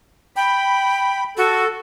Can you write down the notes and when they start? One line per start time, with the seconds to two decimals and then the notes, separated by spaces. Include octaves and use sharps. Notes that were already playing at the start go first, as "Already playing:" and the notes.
0.36 G5 B5
1.37 F#4 A4